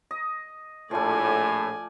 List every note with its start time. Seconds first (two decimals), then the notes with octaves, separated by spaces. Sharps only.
0.11 D#5
0.91 A#1 A2 F3 A3 D5 G#5